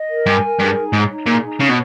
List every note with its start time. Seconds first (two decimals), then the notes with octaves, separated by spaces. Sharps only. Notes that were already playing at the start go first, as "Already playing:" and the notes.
Already playing: D#5
0.09 A#4
0.26 G2 G#5
0.43 A#4
0.59 G2 G#4
0.76 D#4
0.93 G#2 C#5
1.10 D#4
1.26 A#2 G#4
1.44 D#4
1.60 C#3 C#5
1.69 B2